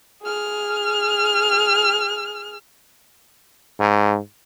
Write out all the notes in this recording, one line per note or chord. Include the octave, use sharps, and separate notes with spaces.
G#4 F6
G#2